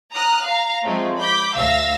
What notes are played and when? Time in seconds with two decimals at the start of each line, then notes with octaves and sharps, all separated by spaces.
0.14 A#5 D#6 F6 F#6
0.44 F5 A#5
0.85 F3 G#3 A3 C4
1.19 B5 D6 G6 B6
1.55 D2 E5 F5 E6 A#6